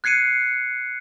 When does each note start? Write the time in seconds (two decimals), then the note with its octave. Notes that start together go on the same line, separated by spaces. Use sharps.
0.04 F#6 G#6 C7 C#7 D#7